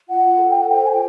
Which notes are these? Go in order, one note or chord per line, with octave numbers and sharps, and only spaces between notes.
F4 F#5
A4
G5
C5 F#5
G5
G#5
F4 G5